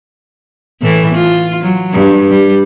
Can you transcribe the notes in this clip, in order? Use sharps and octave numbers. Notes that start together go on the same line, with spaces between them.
A2 E3 A3
F4
F#3
G2
G3